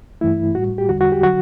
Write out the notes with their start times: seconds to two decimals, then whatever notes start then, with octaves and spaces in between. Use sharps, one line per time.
0.21 G2 E3 A3 E4
0.55 A2 G3 F#4
0.78 G4
0.89 E2 D3 G3 F#4
1.01 F#4
1.12 G4
1.23 D3 F#3 F#4